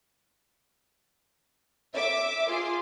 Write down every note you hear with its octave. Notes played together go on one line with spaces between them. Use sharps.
E5 D6
F4 G#4 C6